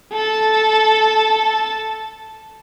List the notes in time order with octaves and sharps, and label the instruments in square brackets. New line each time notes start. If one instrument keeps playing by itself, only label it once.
[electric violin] A4 A5